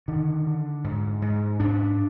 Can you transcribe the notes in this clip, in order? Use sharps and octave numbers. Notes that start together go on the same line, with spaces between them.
D3 D#3
D3
G#2
G#2
G#2 D4